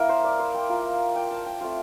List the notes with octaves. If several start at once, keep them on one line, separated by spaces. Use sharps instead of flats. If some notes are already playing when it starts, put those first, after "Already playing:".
Already playing: A#3 E4 A#4
C5
D5
C5
G5
A#3 F4
G5
A5
G5
A3 C4 F4 F5